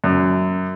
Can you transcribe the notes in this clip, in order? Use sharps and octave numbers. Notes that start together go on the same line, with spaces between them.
F#2